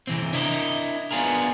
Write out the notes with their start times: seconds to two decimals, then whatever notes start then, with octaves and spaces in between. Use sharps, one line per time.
0.07 C3 E3 C4
0.33 D4 E4 A#4 D#5
1.11 B3 D4 F4 G#4 A#4